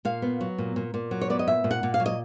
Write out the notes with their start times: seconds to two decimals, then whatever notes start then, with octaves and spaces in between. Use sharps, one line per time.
0.05 A#2 F5
0.22 B3
0.41 F#3
0.58 A#2
0.76 A#2
0.94 A#2
1.11 F#3
1.21 C#5
1.30 B3 D5
1.39 D#5
1.47 A#2 E5
1.64 A#2
1.71 F#5
1.83 A#2
1.94 F5
2.00 F#3
2.06 D#5